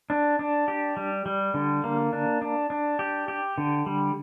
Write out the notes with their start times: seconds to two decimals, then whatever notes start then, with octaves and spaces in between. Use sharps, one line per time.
0.10 D4
0.39 D4
0.68 G4
0.97 G3
1.26 G3
1.54 D3
1.84 A#3
2.13 D4
2.42 D4
2.70 D4
2.99 G4
3.28 G4
3.58 D3
3.86 G3